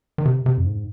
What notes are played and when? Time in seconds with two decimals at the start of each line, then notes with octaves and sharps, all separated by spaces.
0.18 D#3
0.25 C3
0.46 C3
0.58 F2
0.66 G#2